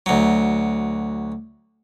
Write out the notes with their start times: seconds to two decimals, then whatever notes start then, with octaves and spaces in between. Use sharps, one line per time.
0.06 D2 F#3